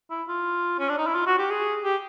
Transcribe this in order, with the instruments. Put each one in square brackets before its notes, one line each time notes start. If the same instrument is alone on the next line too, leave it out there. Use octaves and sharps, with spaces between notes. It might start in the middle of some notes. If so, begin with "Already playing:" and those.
[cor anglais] E4
F4
C#4
D4
D#4
E4
F4
F#4
G4
G#4
G4